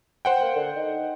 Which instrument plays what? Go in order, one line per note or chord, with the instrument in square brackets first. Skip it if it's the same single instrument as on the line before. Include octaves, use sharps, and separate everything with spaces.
[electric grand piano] C5 F#5 G5
[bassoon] A#3
D3
D#4